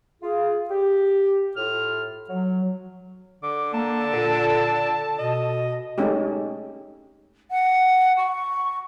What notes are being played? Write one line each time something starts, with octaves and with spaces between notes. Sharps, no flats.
F4 G#4
G4
A2 F4 F6
F#3
D3 D6
A#3 A5
A#2 A4
B2 D#5
G#3 A3 C#4 D#4 G4
F#5
C#6